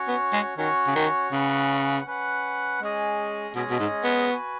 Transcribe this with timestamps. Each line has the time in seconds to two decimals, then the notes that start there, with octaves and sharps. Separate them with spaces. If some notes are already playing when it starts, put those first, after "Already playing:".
Already playing: C#4 F#4 C#5
0.08 B3
0.33 G#3
0.58 D#3 C#4 F#4 C#5
0.87 C#3
0.95 D#3
1.32 C#3 C#4 B4 F#5
2.06 C#4 B4 F#5
2.81 G#3 C#4 G#4 D#5
3.55 B2 G#3 C#4 G#4 D#5
3.70 B2
3.79 G#2
4.04 B3
4.29 F#4 B4 G#5